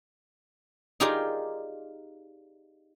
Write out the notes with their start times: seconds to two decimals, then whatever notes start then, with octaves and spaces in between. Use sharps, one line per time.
1.00 D#4 F4 G4 G#4 A#4 D5